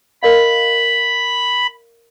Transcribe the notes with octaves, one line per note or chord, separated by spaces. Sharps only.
A#4 D#5 F5 B5